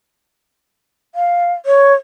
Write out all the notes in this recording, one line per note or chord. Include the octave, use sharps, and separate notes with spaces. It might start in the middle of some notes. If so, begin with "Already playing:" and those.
F5
C#5